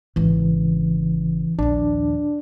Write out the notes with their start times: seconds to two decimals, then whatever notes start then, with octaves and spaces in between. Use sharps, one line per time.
0.16 G#1 C#3 E3
1.59 A#1 D#2 D4